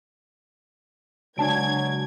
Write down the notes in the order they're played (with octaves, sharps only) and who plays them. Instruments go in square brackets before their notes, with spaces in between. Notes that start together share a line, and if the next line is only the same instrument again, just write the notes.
[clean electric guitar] C#3 G#3 D5 [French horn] F#3 [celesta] D4 A5 D7 [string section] G#6